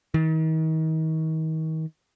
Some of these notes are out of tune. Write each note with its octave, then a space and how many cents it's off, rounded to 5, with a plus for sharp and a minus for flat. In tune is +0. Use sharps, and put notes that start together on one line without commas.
D#3 +35